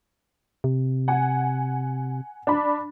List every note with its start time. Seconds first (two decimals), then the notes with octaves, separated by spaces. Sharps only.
0.64 C3
1.08 F#5 G#5
2.47 D4 B5